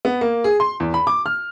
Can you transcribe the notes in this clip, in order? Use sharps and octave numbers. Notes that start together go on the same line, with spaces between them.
B3
A#3
G#4
C6
E2
B5
D6
F6